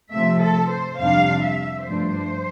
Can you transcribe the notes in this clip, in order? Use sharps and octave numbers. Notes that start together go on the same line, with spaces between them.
C3 F3 A3 E5
A4
C5
F2 C3 G3 D4 F5
E5
G2 F3 A3 D4 C5